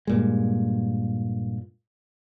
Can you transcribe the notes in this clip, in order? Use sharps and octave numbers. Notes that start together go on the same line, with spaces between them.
G2 A#2 G#3